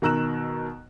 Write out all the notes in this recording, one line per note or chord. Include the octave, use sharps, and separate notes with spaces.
B2 D#3 A#5 E6 F#6 E7